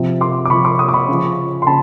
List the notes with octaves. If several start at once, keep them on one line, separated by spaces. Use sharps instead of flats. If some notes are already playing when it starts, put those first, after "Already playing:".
Already playing: C3 F3
C6 D6
D6
C3 F3 B5 C#6
C6 D6
C#6 D#6
D6
B5 C#6
C#3 F3
C6
C#3 A5 B5